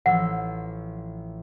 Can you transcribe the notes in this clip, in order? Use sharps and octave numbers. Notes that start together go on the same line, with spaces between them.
A1 F3 F#5 E6